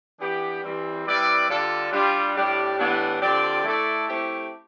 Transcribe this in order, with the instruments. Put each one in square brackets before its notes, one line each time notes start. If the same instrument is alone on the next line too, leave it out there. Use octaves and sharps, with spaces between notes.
[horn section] E3 B3 D4 G4
E3 G3 C4
G3 C4 E4 B4 D5
D3 G3 D4 F4 A4
G3 D4 F4
A2 G3 D4 G4 D5
A2 E3 G3 B3 D4
D3 F3 C4 G4 D5
A3 E4 A4 D5
A3 C4 E4 G4